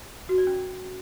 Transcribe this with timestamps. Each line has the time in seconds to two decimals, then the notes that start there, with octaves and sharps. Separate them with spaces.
0.29 F#4
0.38 D5
0.47 C#4